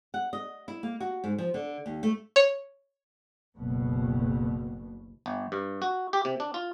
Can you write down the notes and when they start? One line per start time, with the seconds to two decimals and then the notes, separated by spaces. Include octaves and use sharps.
0.14 F#5
0.33 D#5
0.68 E4
0.83 A#3
1.00 F#4
1.24 G#2
1.38 F3
1.54 D3
1.86 D#2
2.03 A3
2.36 C#5
3.56 F#1 D2 B2
5.26 G1
5.52 G2
5.82 F#4
6.13 G4
6.25 C3
6.40 D4
6.54 F4